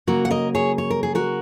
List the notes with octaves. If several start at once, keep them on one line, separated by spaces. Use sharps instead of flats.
C#3 F#3 A#3 F#4 A#4
F#5
A#4 D#5
G#4 C#5
C#5
A#4
G#4
F#4 A#4